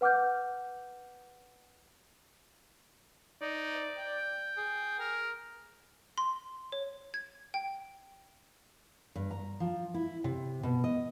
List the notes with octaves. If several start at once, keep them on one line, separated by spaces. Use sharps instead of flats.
B4 F#5 D6 F6 G6
D#4 D5
G5
G#4
A#4
C6
C#5
G#6
G5
G2
A#5
F3
E4
C3
B2
D#5